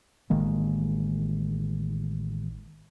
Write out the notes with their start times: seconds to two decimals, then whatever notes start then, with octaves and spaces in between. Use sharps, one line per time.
0.30 A1 D#3 G#3 A#3